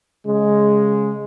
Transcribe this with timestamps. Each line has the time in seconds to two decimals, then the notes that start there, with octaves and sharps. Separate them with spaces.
0.25 C#3 G#3